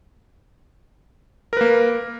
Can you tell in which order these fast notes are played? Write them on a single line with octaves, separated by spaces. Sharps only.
A#4 B4 A#3